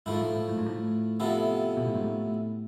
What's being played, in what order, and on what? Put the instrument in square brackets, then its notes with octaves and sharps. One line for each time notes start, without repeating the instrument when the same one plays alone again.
[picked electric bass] G#2 [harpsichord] F3 A3 E4
[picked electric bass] A2
A2
A2
G#2
A2
[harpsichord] C3 F3 B3 E4 A4
[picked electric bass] B2
A2
G#2
A2